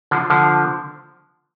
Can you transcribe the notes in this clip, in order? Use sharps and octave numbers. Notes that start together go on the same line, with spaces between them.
D3 F3
D3 F3